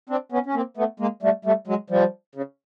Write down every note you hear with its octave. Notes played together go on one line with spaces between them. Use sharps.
C4 D4
B3 C#4
C#4
A#3 C4
A3 B3
G#3 A#3
G3 A3
G3 A3
F#3 G#3
F3 G3
C#3